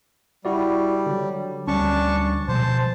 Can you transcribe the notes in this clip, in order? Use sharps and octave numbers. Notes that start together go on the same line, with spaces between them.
G3 E4 F#4 D5
D3 F#3
D2 G3 C#4 D4 A5 C#6
B2 F3 G#3 C5 A5